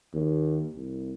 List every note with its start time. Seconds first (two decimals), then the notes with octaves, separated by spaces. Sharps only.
0.13 D#2
0.75 C2